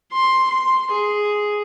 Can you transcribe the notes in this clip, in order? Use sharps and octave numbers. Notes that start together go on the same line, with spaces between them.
C6
C6
G#4